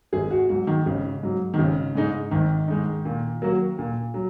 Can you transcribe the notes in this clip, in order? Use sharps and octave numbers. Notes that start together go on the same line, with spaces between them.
G#1 G#4
F#4
G#2 F#3 F#4
D#3
G#1 C#3
G#2 F#3
D#3
G#1 C#3
G#2 G#3 D#4
G#1 D#3
G#2 G#3 D#4
A#2
F#3 A#3 F#4
A#2
F#3